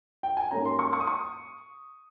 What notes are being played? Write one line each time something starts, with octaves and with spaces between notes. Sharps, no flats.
G5
G#5
G#2 G3 A#3 C#4 A#5
C6
C#6
C#6
D#6
C#6